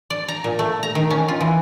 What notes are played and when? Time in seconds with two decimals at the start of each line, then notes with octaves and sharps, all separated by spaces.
0.10 D5
0.28 A#5
0.44 A#2
0.59 A3
0.83 A#5
0.95 D#3
1.10 C#4
1.28 F4
1.41 E3